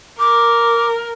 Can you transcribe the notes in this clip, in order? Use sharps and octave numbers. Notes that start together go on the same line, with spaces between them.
A#4 D6